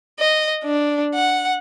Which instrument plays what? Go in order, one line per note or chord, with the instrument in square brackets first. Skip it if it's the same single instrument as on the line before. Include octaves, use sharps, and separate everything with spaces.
[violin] D#5
D4
F#5